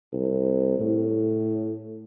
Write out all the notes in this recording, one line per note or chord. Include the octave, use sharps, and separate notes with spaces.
C2
A2